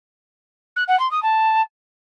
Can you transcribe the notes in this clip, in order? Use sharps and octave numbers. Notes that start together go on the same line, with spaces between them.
F#6
F#5
C6
D#6
A5